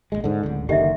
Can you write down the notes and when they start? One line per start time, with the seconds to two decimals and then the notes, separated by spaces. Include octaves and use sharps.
0.12 A#1 E2 G#3
0.24 G#2 D3
0.43 D1 C#2 D3
0.69 F#1 D3 D#3 G4 D#5 E5